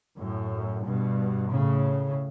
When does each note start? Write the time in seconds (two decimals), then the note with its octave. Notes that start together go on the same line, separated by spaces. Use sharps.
0.18 F#2 A2
0.85 G2 B2
1.51 A2 C#3